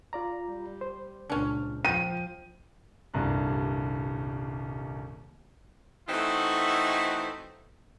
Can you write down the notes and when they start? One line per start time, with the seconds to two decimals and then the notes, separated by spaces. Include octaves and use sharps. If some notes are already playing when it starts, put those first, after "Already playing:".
0.13 F4 D5 A#5
0.43 G3
0.81 C5
1.30 C#2 A#2 C#4 D4
1.85 F3 G5 D#7
3.14 D#1 C2 G2 A#5 F#6
6.09 E3 A3 C4 D#4 E4 F#4